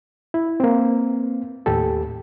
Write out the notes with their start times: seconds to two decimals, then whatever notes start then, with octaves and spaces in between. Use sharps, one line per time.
0.34 E4
0.60 A#3 C4
1.66 D#2 A2 G4 A4